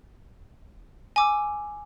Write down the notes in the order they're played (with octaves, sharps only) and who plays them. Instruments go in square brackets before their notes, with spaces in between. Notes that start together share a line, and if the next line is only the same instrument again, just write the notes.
[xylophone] G#5 D6 E6